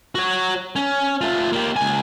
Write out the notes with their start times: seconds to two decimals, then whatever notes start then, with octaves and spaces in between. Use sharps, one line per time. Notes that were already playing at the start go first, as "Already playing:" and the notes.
0.15 F#4 C#5
0.76 C#4
1.21 A3 F4
1.52 A#3 G4
1.76 C#2 G#5